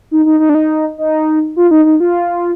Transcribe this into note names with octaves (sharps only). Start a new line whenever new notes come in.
D#4
D#4
D#4
D4
D#4
D#4
F4
D#4
D#4
F4